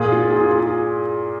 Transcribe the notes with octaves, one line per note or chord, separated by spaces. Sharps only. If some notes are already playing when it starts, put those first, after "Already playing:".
Already playing: A#2 A#3 G#4
F4
G#4
F4
F4
G#4